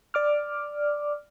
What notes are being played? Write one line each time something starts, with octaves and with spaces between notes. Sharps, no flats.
D5 D6 F6